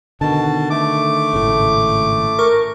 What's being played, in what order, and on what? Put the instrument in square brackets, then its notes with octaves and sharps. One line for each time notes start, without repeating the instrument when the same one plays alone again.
[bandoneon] B2 A5 [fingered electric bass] D3 D#3
[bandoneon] A3 D6
[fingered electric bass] G#1 A2 C#3
[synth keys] A#4 C#6